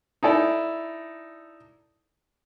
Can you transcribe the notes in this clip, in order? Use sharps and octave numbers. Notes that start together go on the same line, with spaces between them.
D#4 E4 A4 D5